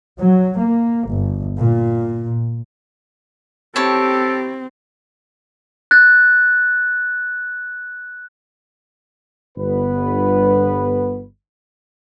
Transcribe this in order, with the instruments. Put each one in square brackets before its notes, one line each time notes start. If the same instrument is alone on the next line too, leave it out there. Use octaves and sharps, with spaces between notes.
[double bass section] F#3
A#3
G1
A#2
[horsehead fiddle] C4 [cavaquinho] E4 C#5 A5 [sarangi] G4 [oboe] A4
[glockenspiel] F#6 A6
[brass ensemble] G1 G2 B3 B4